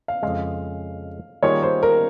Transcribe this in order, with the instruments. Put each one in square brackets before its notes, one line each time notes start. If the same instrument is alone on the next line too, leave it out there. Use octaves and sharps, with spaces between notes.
[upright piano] F5
[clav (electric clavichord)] F2 C#3 G#3 [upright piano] F5
[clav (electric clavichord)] D#3 G3 A#3 F4 G#4 [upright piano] C#5
[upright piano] C5
A#4